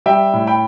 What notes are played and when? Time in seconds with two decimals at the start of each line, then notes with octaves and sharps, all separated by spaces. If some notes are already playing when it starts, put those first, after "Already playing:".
0.06 G3 E5 G5
0.33 A2
0.47 G5 B5